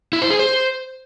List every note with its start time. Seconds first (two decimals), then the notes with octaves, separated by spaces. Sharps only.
0.13 E4
0.22 C5
0.30 G#4
0.39 C5